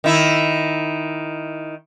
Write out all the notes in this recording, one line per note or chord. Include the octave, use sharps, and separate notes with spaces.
D#3 E4